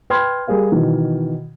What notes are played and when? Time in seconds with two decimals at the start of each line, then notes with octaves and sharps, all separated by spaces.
0.10 B4 G5 B5 C6 F6 G#6
0.48 G3 G#4 A#4 F5
0.71 B2 D#3 E3